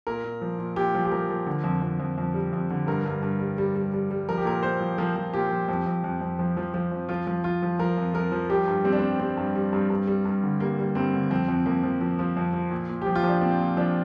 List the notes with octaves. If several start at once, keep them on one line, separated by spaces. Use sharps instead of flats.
A#2 A#4
A#2
F3
A#2
A#2 G4
F3
G4
F3 A#4
F3
D3
F2
F2
F2
F2
G3
F2
D3
G2 A#4
G2
G2
G3
G3
G3
G3
G3
F3 A#4
G4
A#2 A#4
A#2 C5
F3
F3 A#4
F3
A#2 G4
F3
F2
F2
F2
F2
F3
F3
F3
F2
F3 F4
F3
F3 F4
F3
F3 A#4
F2
F2 A#4
F3
G3 G4
G2
G3 C4
D4
G3 C4
G3 C4
G2
G3
G2
G2
G3
G2
D3
G3 A#3
G3
G2 C4
D3
F2 C4
F2
F2 A#3
F3
F3
F3
F2
F3
A#2
A#2
F3 G4
F4
F3 D4
A#2 C4
A#2
F3 D4